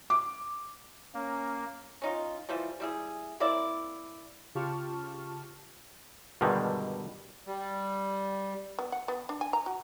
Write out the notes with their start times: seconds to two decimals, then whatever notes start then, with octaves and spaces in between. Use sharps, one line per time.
0.10 D6
1.14 A#3 C#4
2.02 C#4 D#4 F4
2.49 E3 F3 G3
2.80 G3 E4 G#4
3.40 A#3 C4 E4 D5
4.55 C#3 F4 G4 A5 C#6 F6
6.41 G2 B2 D3 D#3 G3 G#3
7.47 G3
8.79 B3
8.92 F#5
9.08 B3
9.29 D4
9.41 G#5
9.53 A#5
9.66 F#4